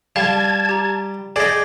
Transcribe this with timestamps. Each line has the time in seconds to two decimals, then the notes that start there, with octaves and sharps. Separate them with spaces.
0.16 G3 F5 A5 G#6
0.69 G4 A#5
1.36 G#4 D5 D#5 G5